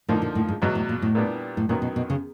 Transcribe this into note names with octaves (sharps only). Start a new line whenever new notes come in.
A2 D3 F3 A#3 D#4
A#2
A2
G#2
E2 G#2 B2 F#3
A2
A#2
A2
A#2 G3 B3 D4 G4
A2
F#2 A#2 D#3 F#3 B3
B2
B2
C#3